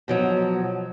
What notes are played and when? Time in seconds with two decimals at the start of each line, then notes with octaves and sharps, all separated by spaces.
0.08 B2 F3 F#3